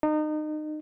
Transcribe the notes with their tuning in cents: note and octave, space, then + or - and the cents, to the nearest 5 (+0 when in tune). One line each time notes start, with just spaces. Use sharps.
D#4 -30